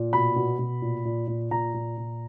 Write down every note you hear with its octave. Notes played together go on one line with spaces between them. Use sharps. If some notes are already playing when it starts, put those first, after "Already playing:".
Already playing: A#2
B2 B5
B2
B2
A#2
A#2
A#2
A#2 A#5
A#2
A#2